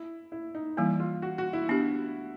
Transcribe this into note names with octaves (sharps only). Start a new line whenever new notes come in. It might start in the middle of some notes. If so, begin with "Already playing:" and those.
Already playing: E4
E4
D#4
E3 G3 A#3 E4
F4
F#4
F#4
E4
B3 D4 G4